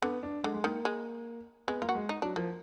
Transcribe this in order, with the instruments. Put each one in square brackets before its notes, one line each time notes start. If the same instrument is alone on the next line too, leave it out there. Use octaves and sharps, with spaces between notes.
[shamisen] D3 [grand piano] B3
[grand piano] D4
[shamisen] D3 [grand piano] G#3
[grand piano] G#3
[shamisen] D#3 [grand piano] A#3
[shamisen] G#3
[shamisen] G#3 [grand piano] B3
[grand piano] A#3 [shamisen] F4
[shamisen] F#4
[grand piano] G#3
[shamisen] D#4
[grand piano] F#3 [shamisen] D4
[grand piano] F3 [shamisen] A#3